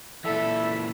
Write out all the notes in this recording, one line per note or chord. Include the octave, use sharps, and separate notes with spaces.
A#2 E3 A4 D5 E5 A5 B5